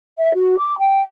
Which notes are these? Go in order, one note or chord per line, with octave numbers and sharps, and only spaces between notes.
E5
F#4
D6
G5